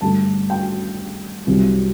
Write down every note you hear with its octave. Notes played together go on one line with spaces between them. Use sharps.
G2 D3 A3 A5
G5
C2 C3 F#3